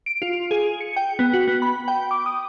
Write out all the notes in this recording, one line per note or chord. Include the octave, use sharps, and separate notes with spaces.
D7
F4
G#4
C#7
G5
B3
F#4
B3
B5
G5
D6
D#6